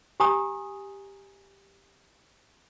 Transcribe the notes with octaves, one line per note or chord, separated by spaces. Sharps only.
G4 G#5 A#5 D#6